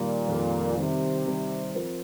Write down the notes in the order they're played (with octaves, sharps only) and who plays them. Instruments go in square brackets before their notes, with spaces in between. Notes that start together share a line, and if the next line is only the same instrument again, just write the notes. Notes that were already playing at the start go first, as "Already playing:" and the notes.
Already playing: [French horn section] A#2 [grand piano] D#3 G3 A#3
[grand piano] F2 D#3 G3 A#3
[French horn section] C3 [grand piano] D#3 G3 C4
[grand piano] D#3 G3 C4
F3 C4 F4 A#4